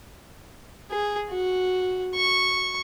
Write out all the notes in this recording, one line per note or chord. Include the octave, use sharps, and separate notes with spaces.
G#4
F#4
C#6